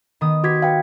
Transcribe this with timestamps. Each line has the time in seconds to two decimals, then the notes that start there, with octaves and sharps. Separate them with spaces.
0.21 D#3 B3 D#6
0.44 F#4 G4 B4 G#6 B6
0.62 B4 F5 G5